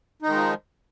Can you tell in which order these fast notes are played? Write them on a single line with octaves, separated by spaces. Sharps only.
D#4 D#3 G#3 F3